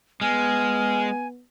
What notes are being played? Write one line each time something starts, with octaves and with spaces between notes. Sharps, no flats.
G#3 B3 G#5 F6